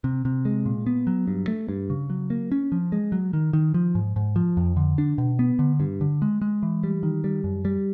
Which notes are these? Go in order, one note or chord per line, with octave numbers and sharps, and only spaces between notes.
C3
C3
G#3
A#2
B3
F#3
G2
A3
G2
C#3
F#3
A#3
C#4
F3
G#3
F#3
D#3
D#3
F3
G#2
G#2
F3
F2
D3
D4
B2
B3
D3
G2
D3
G#3
G#3
E3
G3
D#3
G3
F#2
G3